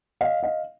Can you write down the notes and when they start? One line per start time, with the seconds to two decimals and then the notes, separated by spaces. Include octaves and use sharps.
0.21 D#5 F5
0.43 D#5 F5